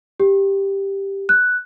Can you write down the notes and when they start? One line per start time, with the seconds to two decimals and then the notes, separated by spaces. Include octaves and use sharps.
0.20 G4
1.29 F#6